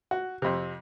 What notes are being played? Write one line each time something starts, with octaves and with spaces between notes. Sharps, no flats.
F#4
F2 C3